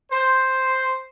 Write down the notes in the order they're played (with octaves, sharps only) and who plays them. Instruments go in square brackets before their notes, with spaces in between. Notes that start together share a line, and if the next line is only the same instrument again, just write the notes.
[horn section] C5